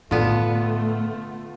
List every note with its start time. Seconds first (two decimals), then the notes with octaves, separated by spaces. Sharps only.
0.11 A2 D3 D#3 A3 B3 F4